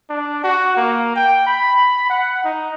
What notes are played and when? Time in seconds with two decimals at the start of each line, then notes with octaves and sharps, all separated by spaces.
0.10 D4
0.44 F#4
0.77 A#3
1.16 G5
1.47 B5
2.10 F#5
2.44 D#4